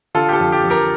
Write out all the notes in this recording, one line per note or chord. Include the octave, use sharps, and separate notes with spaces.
D3 F4 A4
G4
F4 A4
F2
G4
F2
G4 A#4